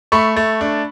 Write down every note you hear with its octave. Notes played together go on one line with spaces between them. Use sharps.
A3 B5 C#6
A3
D4